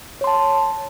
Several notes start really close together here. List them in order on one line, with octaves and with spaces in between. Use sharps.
C#5 C6 A5